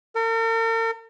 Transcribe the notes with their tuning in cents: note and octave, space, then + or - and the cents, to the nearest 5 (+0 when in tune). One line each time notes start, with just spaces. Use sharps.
A#4 -45